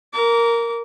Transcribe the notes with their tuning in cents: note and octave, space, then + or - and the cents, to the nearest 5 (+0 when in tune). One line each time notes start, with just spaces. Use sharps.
A#4 +0 D6 -30